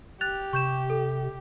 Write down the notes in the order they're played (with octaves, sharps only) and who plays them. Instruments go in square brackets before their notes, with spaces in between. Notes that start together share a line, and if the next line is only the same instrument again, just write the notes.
[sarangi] G4 [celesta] F#6 A6 F7
[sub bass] C3 [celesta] C#6 G6 E7
[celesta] A4